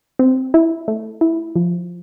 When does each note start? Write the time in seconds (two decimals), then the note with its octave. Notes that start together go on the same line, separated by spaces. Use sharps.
0.19 C4
0.54 E4
0.88 A3
1.21 E4
1.56 F3